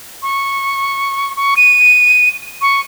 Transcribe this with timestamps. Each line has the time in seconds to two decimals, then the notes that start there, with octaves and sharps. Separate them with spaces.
0.23 C#6
1.36 C#6
1.57 D#7
2.61 C#6